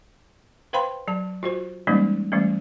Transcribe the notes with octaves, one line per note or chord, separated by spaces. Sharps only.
B4 C5 F5 G5 B5 C6
F#3 A5
F4 F#4 C5
E3 G3 G#3 A#3 C#4 D#4
E3 G3 A3 C#4